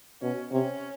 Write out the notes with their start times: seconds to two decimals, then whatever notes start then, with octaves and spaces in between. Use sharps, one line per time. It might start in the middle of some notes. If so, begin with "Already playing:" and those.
0.22 B2 C#4
0.52 C3 C#4